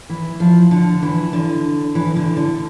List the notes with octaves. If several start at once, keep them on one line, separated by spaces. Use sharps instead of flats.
E3
F3
D3
E3
D3
E3
D3
D3